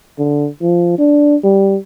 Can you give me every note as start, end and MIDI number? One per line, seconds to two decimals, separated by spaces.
0.18 0.48 50
0.61 0.95 53
0.98 1.36 62
1.44 1.78 55